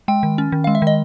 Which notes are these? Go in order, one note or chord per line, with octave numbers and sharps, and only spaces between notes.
G#3 G5
D#3
C#4
D#3
F5
G#3
E5
D#3 D#5